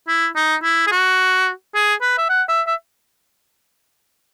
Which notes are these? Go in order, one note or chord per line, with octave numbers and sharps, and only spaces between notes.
E4
D#4
E4
G#4
F#4
G#4
B4
E5
F#5
E5
E5